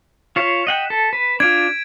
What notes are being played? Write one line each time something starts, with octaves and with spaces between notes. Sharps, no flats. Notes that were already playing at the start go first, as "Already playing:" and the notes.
F4 C#5 F5 B6 E7
D#5 F#5 G5
A4
B4
D4 F4 G#6 D7